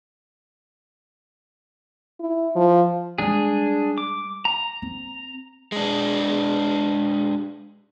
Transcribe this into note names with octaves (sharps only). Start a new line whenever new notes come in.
E4
F3
G3 G#3 D4 G#4
D6
A#5
C4
G#3 D4